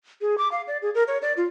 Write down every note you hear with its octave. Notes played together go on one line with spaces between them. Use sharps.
G#4
D6
F5
D5
G#4
A#4
C#5
D5
F4